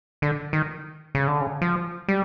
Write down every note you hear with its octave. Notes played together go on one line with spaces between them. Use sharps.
D3
D#3
C#3
D3
C#3
F3
G3